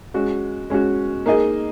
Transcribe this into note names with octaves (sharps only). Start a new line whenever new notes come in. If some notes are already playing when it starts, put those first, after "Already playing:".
G#3 C#4 F#4
G#3 C#4 F#4
A#3 D#4 G#4 D#5